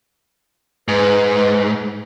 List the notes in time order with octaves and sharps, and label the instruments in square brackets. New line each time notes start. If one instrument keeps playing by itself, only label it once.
[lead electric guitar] G#2 [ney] B4